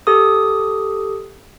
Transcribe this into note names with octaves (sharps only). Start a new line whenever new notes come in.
G4 A4 D#6